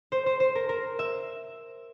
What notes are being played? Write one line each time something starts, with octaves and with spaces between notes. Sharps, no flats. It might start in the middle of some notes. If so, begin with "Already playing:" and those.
C5
C5
C5
A#4
A#4
E5